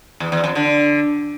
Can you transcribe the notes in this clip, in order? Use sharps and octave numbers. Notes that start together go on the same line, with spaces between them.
E2
E2
F2
D3